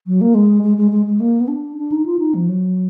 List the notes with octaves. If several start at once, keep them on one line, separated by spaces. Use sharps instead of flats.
F#3
A#3
G#3
G#3
G#3
G#3
G#3
A#3
B3
D4
D4
D#4
F4
D#4
F3
F#3